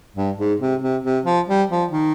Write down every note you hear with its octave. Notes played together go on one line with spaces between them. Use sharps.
G2
G#2
C3
C3
C3
F3
G3
F3
D#3